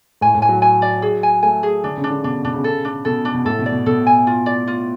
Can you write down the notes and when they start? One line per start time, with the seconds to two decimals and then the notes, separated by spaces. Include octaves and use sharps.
0.21 A2 G#5
0.35 A2
0.42 G#5
0.49 F#3
0.62 G#5
0.82 D5
1.02 G#4
1.23 G#5
1.43 A3 G#5
1.63 G#4
1.84 D3 D4
1.97 C#3
2.04 D4
2.10 D3
2.24 B2 D4
2.44 B2 D4
2.54 C#3
2.64 A4
2.85 D4
3.05 B2 A4
3.25 D4
3.34 B2
3.45 A2 A4
3.59 B2
3.66 D5
3.72 B2
3.86 B2 A4
4.07 G#5
4.27 F4
4.46 D5
4.67 F4